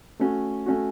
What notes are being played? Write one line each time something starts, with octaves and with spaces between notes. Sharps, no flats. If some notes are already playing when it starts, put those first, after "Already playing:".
A3 C#4 F#4
A3 C#4 F#4